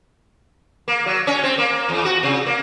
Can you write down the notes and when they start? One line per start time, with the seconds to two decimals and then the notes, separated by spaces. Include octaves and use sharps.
0.88 A#3
1.06 F#3
1.27 C#4
1.44 C4
1.58 A#3
1.89 E2
2.05 F#4
2.23 C3
2.46 A#3